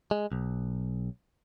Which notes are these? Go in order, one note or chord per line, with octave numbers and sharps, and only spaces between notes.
G#3
B1